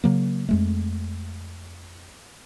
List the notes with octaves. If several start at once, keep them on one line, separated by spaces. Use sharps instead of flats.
C#3 F#3 A#3
F2 G#3 A3